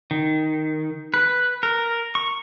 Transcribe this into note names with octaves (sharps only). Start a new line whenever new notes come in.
D#3
B4
A#4
C#6